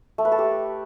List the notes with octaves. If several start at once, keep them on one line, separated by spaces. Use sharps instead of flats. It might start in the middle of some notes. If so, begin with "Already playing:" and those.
A3
B4
A4
G4